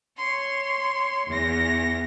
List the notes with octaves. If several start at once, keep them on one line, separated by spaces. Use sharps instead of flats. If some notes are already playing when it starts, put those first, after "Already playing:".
C#5 C6
E2 A#6